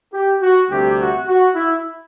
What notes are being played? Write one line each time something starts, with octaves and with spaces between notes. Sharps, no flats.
G4
F#4
D2 C3 G3 G4
F#4
F#4
E4